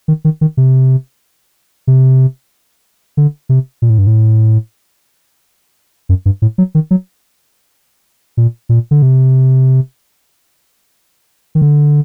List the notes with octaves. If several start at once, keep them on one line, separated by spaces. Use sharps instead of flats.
D#3
D#3
D#3
C3
C3
D3
C3
A#2
A2
G2
A2
F#2
G2
A2
F#3
D#3
F#3
A#2
A#2
D3
C3
D#3
D3